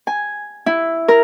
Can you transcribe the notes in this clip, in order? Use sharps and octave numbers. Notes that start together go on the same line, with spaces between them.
G#5
E4
A#4